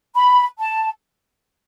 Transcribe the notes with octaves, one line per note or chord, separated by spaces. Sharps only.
B5
A5